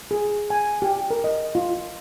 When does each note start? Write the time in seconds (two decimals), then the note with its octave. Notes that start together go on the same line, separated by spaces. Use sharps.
0.11 G#4
0.50 G#5
0.82 G4
1.11 A#4
1.24 D#5
1.55 F4